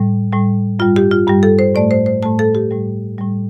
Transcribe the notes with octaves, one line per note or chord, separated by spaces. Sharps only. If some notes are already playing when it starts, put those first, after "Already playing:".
Already playing: A2 G3
A2 G3
G2 G3 F4
G4
F4
G2 G3 G4
A4
C5
A2 A3 D5
C5
C5
A2 A3 A5
A4
G4
A2 G3
A2 G3